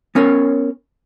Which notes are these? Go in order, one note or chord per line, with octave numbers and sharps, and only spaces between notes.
B3 C#4 A#4 C#5